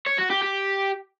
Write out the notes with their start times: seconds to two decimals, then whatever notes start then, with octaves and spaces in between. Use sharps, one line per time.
0.07 C#5
0.19 F#4
0.31 G4
0.42 G4